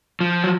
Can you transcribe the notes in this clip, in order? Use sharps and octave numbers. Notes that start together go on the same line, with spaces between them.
F3
F#3